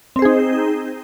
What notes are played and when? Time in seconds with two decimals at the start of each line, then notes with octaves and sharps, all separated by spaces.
0.16 C4
0.19 C5
0.22 G#4
0.25 D#4